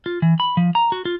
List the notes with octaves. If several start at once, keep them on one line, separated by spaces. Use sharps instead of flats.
F4
E3
B5
F3
A#5
F#4
F4